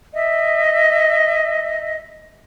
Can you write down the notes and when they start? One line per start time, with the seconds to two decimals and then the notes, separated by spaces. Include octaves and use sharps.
0.13 D#5 E5